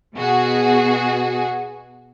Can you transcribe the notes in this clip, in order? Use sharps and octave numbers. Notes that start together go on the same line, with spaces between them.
B2 F#4 G#4